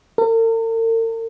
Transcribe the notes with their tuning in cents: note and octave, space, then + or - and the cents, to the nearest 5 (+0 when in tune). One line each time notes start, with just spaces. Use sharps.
A#4 -45